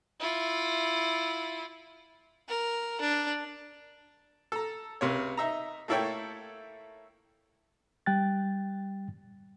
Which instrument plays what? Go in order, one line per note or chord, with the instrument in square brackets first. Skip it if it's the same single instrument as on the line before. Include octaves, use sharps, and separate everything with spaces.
[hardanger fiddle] E4 F4
A#4
D4
[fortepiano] A4 A#5
C#2 C3 A#4 C#5
D#4 E5 A#5
A3 A#3 E4 A4 C#5 G5
[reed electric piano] G3 G5 F#6 A6